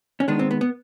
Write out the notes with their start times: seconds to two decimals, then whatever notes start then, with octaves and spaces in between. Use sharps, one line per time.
0.20 C#4
0.28 D#3 G#3 B3 D4
0.39 C4
0.51 B3
0.61 B3